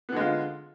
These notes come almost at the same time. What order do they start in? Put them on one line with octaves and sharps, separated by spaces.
B3 D3 G#3 F4